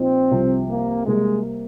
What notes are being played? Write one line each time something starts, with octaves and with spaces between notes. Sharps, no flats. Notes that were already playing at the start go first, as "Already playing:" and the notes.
Already playing: A#2 F3 C4 D#4
C2 C3 F3
A#3
C3 G3 G#3 A#3